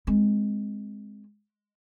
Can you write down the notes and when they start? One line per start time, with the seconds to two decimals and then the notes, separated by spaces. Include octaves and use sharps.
0.07 G#3 C4